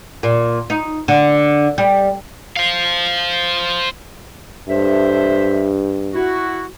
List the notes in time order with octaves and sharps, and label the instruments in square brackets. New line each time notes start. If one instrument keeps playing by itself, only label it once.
[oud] A#2
D#4
D3
G3
[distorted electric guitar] C5 F5
[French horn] G2 [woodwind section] A4 C5 E5
[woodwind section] E4 F#4